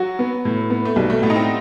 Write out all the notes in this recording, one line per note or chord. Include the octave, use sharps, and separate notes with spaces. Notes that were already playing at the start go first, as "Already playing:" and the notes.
Already playing: F#3 F#4
B3
A2
B3
A3
B1 G3
A3
A2 B3
D#4
C4